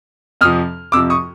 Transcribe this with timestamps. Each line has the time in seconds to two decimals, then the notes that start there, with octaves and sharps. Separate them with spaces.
0.41 F2 C3 F3 D#6 F6
0.92 F2 C3 F3 D6 E6
1.10 C#6 D#6